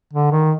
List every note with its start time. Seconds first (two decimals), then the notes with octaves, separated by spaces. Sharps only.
0.13 D3
0.32 D#3